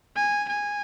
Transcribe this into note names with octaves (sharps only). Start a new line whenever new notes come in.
G#5
G#5